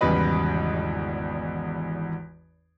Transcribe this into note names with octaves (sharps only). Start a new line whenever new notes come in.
G#1 E2 C#3 G3 B4 D#5